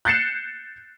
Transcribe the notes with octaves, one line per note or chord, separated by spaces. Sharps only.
F#6 G6 A6 C7 C#7 E7